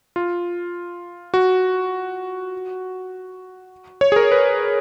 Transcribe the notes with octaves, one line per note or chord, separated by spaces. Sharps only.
F4
F#4
C#5
G#4
A#4
B4